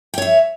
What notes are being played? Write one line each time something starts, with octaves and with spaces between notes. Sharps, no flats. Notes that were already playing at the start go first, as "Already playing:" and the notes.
C#5 E5 G5